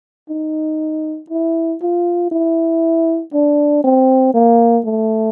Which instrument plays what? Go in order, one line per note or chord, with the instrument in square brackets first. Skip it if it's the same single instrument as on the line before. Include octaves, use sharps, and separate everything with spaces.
[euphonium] D#4
E4
F4
E4
D4
C4
A#3
A3